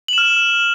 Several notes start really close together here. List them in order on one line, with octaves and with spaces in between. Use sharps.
F#7 E7 F6